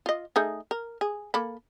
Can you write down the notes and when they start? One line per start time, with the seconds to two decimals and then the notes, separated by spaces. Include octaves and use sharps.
0.06 F4 D#5
0.36 A3 D#4 G#4
0.71 A#4
1.01 G#4
1.34 A#3 A4 B5